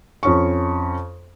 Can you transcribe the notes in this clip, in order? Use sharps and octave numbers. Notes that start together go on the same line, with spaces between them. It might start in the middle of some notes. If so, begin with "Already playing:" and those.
F2 C#4 C#6